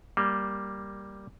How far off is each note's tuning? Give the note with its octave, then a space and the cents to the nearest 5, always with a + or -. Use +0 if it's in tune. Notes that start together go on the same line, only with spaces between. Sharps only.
G3 +0 A#3 +0